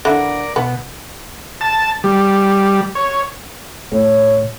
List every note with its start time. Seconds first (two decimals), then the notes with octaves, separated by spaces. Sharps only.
0.05 D3 E4 A#4 D5
0.56 B2 B3
1.61 A5
2.04 G3
2.95 C#5
3.92 A2 C#5